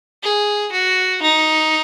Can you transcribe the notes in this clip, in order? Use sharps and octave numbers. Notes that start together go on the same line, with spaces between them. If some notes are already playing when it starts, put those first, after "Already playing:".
G#4
F#4
D#4